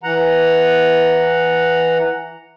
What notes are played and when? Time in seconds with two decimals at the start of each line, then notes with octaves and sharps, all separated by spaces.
0.03 E3 F#5 A#5